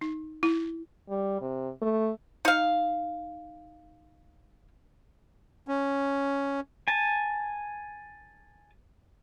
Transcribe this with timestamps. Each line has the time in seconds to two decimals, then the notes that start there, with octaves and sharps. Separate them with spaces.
0.01 D#4
0.43 E4
1.09 G3
1.41 C3
1.81 A3
2.45 D#4 F5
5.68 C#4
6.88 G#5 A5